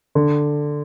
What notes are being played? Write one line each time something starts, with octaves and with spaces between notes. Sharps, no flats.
D3